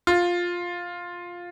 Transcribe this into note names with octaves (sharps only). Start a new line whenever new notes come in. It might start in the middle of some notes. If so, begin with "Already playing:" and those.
F4